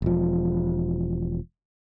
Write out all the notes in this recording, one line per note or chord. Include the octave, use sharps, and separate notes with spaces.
E1 F3